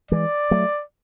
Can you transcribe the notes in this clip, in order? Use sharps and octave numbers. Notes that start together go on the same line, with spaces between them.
E3 G#3 D5
F#3 A3